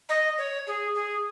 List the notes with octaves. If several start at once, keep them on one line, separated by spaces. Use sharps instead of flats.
D#5
C#5
G#4
G#4